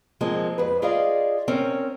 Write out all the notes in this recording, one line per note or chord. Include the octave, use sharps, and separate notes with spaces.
F3 G#3 A#3 C4
F2 B4
F4 G#4 D5 D#5 F5
C4 C#4 A#4